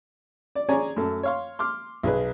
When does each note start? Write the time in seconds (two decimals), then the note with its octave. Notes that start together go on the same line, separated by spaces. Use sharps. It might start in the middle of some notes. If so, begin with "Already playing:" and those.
0.55 D5
0.69 C#4 G#4 C#5 D5 G#5 A#5
0.96 F#2 A3 A4
1.23 C#5 F5 C6
1.59 C6 D6 F6
2.03 B1 G#4 B4